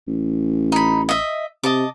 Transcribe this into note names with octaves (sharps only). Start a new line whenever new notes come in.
A1
D#4 B5
D#5 E5
C3 D#5 A5 D6